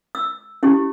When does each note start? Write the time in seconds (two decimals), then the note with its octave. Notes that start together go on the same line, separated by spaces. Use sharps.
0.15 E6
0.63 C#4 E4 G4